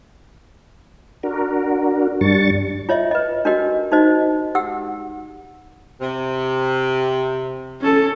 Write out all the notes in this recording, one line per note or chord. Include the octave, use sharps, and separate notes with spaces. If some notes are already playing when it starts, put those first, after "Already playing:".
D4 F#4 A#4
G2 G3 D4 C#6 A6
F4 C#5 D#5 E5
B4 D#5
D4 F#4 G4 A#4 D#5
D#4 F#4 C5 D#5
G4 F#5 E6
C3
C#4 A4